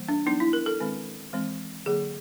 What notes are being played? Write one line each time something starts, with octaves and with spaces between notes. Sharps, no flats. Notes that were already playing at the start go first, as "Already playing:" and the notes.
Already playing: E3 G3 A#3
D4
F#3 B3 D4 D#4
E4
A#4
A4
D#3 G#3 C4
E3 G#3 C4
D3 F#3 A#3 G#4